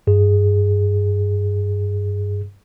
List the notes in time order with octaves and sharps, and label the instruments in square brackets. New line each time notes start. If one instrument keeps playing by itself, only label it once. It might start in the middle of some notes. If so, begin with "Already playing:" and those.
[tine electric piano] G2 G#4